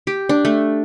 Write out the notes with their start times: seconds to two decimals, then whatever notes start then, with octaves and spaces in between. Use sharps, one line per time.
0.07 G4
0.29 D4
0.45 A3